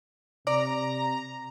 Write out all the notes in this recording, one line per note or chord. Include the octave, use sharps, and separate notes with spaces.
C3 D5 A#5